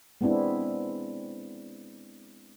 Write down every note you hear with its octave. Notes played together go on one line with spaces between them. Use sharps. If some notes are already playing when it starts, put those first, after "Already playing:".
G#3 B3 C4 D4 E4